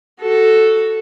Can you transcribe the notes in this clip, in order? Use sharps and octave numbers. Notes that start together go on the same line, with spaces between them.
F#4 A4